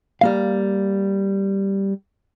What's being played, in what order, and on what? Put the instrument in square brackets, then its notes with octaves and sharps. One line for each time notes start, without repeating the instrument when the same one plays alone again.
[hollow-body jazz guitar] G3 A#3 F5